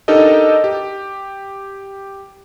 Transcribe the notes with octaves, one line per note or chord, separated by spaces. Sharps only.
D4 D#4 G4 A4 A#4 D#5
G4